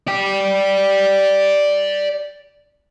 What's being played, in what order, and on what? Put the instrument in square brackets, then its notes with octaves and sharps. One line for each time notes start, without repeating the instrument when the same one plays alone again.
[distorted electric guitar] D5 G5